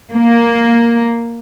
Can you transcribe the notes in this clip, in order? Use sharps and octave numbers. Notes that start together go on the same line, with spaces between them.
A#3